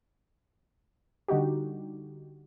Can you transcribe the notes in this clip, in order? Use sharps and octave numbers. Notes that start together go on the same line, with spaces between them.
D3 G3 D#4 F#4 G4